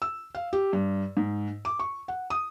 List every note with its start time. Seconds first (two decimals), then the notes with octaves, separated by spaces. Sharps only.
0.02 E6
0.35 F5
0.53 G4
0.73 G2
1.17 G#2
1.65 D6
1.79 C#6
2.08 F#5
2.30 D#6